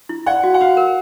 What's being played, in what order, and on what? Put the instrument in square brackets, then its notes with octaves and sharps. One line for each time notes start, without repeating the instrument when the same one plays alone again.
[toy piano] E4
[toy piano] D5 [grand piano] F#5
[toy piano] F#4
[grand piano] F#5
[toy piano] F#4 [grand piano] F5
[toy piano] A#4